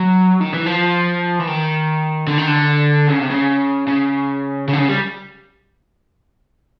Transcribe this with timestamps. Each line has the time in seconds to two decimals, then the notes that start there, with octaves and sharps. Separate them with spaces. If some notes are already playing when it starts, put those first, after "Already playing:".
Already playing: F#3
0.41 D#3
0.54 E3
0.66 F3
1.40 E3
1.47 D#3
2.27 D3
2.38 D#3
2.47 D3
3.08 C#3
3.19 C3
3.30 C#3
3.88 C#3
4.68 C#3
4.73 D3
4.78 C#3
4.89 G3